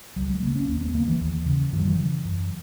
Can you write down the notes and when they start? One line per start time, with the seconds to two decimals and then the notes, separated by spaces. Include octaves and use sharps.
0.16 C#2 F#3
0.30 G#3
0.42 C#3 A#3
0.56 C#4
0.68 D#2 A#3
0.81 B3
0.95 C#3 A#3
1.07 E3
1.20 D#2
1.46 C#3
1.72 F#2 E3
1.80 F#3
1.87 E3
1.99 C#3
2.25 F#2